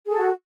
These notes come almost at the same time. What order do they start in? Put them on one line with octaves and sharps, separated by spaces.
G#4 A4 F#4